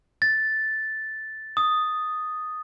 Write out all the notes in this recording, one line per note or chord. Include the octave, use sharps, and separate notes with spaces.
A6
D#6